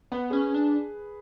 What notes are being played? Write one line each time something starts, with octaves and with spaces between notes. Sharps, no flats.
B3 B4
C#4 G#4 B4
D4